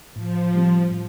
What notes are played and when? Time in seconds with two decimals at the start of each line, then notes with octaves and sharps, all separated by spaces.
0.16 A2 F3
0.55 G3 C4
0.91 A2